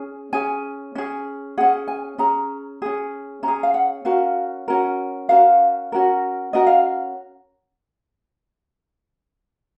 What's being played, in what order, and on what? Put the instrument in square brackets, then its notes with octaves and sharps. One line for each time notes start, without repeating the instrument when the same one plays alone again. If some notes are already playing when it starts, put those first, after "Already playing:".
Already playing: [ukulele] C#4 G#4
C#4 G#4 G#5
C#4 G#4
C#4 G#4 F#5
G#5
C#4 G#4 A#5
C#4 G#4
C#4 A#5
G#4
F5
F#5
C#4 F#4 A#4 F5
C#4 F#4 A#4
C#4 F#4 A#4 F5
C#4 F#4 A#4
C#4 F#4 A#4 D#5
F5